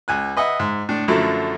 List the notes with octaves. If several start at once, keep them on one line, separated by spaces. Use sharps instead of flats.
C#2 G#5 F#6
B4 D#5 E5 F#5
G#2
A2 D4
F#2 D3 F3 F#3 A3 E4